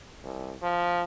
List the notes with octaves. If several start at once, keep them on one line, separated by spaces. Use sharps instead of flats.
C2
F3